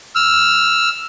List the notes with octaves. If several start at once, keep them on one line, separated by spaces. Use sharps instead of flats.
E6 F6